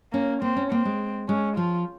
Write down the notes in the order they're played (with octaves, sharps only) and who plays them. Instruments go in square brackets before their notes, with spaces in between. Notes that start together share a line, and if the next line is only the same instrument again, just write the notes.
[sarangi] A#3 [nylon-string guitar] C#4
[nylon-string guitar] A#3 [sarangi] C4
[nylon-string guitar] C#4
[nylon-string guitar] A#3 [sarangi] C4
[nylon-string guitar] G#3
[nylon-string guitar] G#3 [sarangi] C#4
[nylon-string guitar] F3 [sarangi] F4